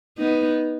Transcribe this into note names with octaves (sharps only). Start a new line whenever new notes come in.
B3 D#4